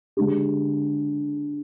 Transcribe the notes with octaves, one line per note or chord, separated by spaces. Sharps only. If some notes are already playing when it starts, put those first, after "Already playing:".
D3 G#3 D4 G4